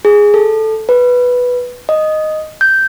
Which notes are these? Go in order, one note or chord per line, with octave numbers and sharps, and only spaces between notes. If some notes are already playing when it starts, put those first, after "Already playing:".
G#4
A4
B4
D#5
G6